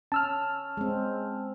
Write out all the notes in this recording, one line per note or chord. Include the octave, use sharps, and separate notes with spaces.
C#4 A5 E6 F6
G#3 C4